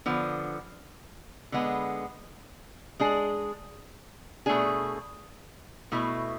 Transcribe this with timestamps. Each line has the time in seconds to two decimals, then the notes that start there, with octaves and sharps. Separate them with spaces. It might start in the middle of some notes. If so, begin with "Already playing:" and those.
0.06 D3 F3 B3
1.52 D3 G#3 B3
3.00 G#3 D4 G#4
4.46 B2 A3 D4 G#4
5.92 B2 A3 E4